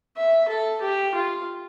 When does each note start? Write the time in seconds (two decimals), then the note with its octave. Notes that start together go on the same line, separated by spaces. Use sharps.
0.17 E5
0.49 A4
0.81 G4
1.15 F4